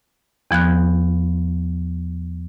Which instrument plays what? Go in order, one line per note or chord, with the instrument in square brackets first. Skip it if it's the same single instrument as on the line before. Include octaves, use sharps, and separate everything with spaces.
[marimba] E2 F3 B3 F#6